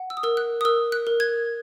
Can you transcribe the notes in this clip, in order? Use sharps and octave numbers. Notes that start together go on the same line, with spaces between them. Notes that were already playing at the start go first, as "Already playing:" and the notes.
Already playing: F#5
E6
D#6
A#4 E6
F#6
D#6
A#4 E6
F#6
A#4
G#6